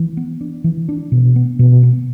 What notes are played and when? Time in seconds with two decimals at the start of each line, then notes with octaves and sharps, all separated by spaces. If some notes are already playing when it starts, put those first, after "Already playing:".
Already playing: E3
0.17 B3
0.41 D4
0.64 E3
0.89 D4
1.12 B2
1.36 B3
1.59 B2
1.83 B3